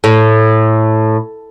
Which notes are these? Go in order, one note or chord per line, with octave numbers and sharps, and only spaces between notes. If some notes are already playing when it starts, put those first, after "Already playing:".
A2